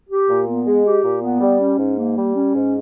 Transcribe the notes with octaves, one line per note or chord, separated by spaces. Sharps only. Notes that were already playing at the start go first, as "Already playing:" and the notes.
G4
A#2
B3
G#3
G4
A#2
B3
G3
C#4
G#2
A#3
G3
C#4
G#2